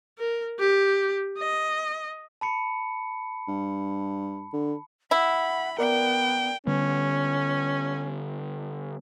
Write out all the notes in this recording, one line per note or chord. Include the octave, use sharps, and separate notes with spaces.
A#4
G4
D#5
A5 B5 C#7
G2
D3
E4 F#5 B5
B3 A#4 D5 G5
D3 G3 B3 C#4